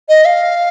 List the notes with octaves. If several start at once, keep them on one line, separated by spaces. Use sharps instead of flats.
D#5
F5